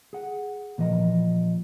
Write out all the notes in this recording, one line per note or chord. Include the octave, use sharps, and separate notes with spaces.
G#4 F#5
A#2 E3 F3 D#5